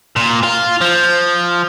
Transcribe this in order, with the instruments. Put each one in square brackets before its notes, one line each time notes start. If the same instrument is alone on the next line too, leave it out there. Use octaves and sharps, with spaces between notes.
[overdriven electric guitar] A#2
F4
F3